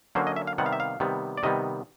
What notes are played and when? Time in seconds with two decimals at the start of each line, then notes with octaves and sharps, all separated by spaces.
0.15 D3 F#3 A#3 C#4 C5
0.27 D#5
0.36 E5
0.47 F5
0.58 C3 D#3 G3 B3 F#5
0.66 F5
0.73 E5
0.80 F5
1.00 C3 D#3 G3 B3
1.38 D5
1.43 C3 D#3 G3 B3 D#5